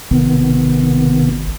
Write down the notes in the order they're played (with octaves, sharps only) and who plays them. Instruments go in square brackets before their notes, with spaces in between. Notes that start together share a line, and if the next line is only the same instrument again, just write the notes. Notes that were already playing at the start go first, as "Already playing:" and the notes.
[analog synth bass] G#1 [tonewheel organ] C3 D#3 B3